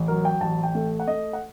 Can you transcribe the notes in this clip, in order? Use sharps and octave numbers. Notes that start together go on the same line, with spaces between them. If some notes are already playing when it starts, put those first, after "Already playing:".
Already playing: A1
F#3 A#4
G5
A1 A5
G5
A3
F#5
A3 D#5
F#5